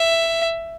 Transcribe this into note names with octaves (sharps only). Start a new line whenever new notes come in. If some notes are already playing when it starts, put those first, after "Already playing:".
Already playing: E5